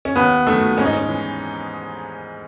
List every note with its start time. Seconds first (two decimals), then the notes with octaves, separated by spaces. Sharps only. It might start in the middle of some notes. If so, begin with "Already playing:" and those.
0.05 C#4
0.16 D#2 B3
0.47 D#3 F#3 A3
0.78 G#2 C#4
0.86 D#4
0.93 C#4
1.09 E3